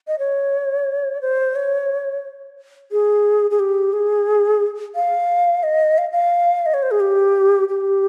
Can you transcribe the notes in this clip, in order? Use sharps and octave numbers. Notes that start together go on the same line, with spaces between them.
D#5
C#5
C5
C#5
G#4
G#4
G4
G#4
F5
D#5
F5
F5
D#5
C#5
C5
G#4
G4
G4